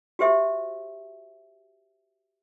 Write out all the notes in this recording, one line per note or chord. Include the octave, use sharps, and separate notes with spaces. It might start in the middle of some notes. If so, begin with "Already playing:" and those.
F#4 G4 C5 E5